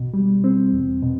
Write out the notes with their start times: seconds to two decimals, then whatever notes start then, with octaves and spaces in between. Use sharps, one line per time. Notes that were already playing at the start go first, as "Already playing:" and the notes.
Already playing: B2
0.14 G3
0.44 C4
0.73 E2
1.02 B2